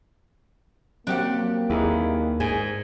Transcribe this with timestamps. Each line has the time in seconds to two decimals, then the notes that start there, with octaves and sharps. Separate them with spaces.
1.07 F#3 A#3 C4 D4 G4 F#5
1.70 D#2 D#4 E4 G#4
2.40 G#2 G#4 G#5